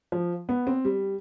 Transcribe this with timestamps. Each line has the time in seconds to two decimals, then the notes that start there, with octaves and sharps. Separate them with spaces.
0.12 F3
0.49 B3
0.67 C4
0.85 G3